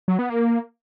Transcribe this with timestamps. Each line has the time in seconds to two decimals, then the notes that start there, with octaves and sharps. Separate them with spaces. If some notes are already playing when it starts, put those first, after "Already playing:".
0.08 F#3
0.19 B3
0.30 A#3